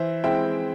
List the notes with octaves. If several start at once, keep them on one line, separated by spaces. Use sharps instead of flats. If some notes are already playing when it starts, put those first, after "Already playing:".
Already playing: E3 C5 E5
G#3 C4 E4 E5 G5